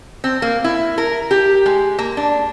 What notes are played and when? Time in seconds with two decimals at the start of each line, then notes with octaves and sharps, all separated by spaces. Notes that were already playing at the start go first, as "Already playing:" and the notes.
0.24 C4
0.42 A#3
0.64 E4
0.98 A#4
1.31 G4
1.66 G#3
1.99 A#3
2.17 D4